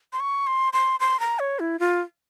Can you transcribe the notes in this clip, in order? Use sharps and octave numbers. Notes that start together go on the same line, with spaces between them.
C6
C#6
C6
C6
C6
A#5
C#5
E4
F4